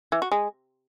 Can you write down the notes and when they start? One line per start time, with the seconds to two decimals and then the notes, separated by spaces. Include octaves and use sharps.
0.12 E3
0.22 F#4
0.32 G#3